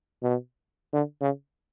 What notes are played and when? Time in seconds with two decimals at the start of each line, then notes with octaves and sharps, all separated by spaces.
0.22 B2
0.93 D3
1.21 C#3